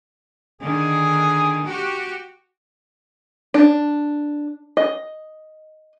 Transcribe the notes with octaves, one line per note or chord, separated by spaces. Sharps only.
D3 D#3 G#4
F#4 G4
D4
D#5